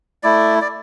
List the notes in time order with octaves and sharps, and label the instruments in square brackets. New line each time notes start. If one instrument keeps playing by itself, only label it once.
[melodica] A3 E4 D5
D5